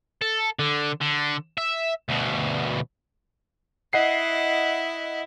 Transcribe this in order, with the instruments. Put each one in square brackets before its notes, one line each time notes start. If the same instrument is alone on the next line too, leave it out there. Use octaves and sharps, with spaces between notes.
[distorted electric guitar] A4
D3
D3
E5
D2 B2
[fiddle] E4 [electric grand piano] D#5 F#5 C7